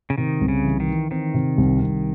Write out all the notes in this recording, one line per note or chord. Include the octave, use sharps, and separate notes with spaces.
C#3
C3 D#3
C2
C#3
E3
D#3
E3
D#3 C4
C3
C2
C2